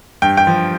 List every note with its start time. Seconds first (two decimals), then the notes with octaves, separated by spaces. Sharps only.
0.22 G2 G5
0.37 G5
0.47 F3